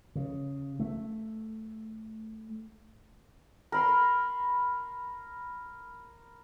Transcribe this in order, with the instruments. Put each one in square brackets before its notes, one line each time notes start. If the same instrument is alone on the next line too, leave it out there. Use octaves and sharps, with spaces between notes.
[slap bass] C#3
A3
[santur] A#4 B5 C6